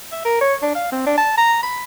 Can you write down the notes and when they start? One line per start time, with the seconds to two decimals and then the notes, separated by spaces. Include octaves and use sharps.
0.12 E5
0.25 A#4
0.41 C#5
0.62 D4
0.75 F5
0.92 C4
1.06 D4
1.18 A5
1.38 A#5
1.63 B5